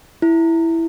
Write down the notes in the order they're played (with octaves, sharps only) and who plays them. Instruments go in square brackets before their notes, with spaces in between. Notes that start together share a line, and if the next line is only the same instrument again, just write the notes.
[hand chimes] E4